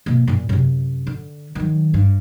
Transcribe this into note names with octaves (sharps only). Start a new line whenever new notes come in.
B2 A#3
F#2 A#2
F#2 C3
D3
D#3 F#3
G2